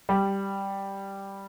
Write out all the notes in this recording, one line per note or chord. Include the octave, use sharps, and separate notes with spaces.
G3